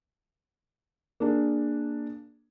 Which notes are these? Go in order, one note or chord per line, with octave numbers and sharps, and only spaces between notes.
A#3 D4 G#4